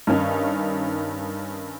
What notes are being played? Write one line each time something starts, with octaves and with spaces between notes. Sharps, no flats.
G2 D#3 C#4 D#4